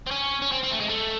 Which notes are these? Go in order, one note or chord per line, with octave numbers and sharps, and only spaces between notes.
C4
C#4
C#4
C4
C4
A3
G#3
A3